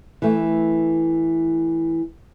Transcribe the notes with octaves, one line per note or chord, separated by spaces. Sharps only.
E3 A3